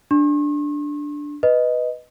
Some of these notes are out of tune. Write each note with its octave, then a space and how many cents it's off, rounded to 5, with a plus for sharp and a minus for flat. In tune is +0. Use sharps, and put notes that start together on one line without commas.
D4 +0 C#6 -45
B4 +0 D#5 +0